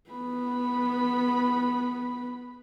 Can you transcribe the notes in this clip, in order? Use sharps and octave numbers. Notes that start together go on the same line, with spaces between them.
B3 B5